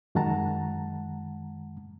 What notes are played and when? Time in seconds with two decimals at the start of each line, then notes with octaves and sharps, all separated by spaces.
0.15 F#2 D#3 G#3 F#5 A5 A#5